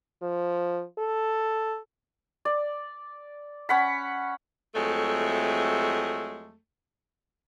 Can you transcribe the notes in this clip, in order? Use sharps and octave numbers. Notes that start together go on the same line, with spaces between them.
F3
A4
D5
C#4 F#5 B5
F2 F#3 G#3 A3